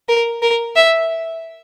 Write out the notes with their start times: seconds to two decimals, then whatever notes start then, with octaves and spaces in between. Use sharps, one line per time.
0.09 A#4
0.42 A#4
0.76 E5